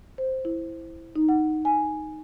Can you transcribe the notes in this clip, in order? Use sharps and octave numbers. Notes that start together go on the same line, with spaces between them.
C5
E4
D#4
F#5
G#5